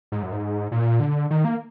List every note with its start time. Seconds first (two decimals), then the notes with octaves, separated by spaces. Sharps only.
0.12 G#2
0.22 F#2
0.32 G#2
0.72 A#2
1.00 D3
1.31 D#3
1.45 A#3